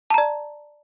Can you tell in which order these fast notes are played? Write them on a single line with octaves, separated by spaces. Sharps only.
A5 A#5 D5